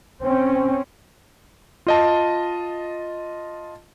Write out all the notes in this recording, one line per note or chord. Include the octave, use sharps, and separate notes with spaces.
C4 C#4
F4 D#5 A5